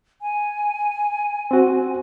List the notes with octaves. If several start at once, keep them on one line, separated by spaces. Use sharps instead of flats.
G#5
C4 F#4